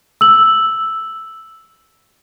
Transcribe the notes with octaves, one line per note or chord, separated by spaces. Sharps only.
E6 F#7